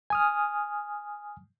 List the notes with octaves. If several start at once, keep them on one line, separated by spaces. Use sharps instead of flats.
G#5 D#6 F6